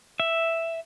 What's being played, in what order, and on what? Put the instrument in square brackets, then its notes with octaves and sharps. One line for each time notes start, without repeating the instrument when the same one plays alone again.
[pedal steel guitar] E5